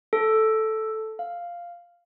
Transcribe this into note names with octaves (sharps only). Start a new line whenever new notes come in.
A4
F5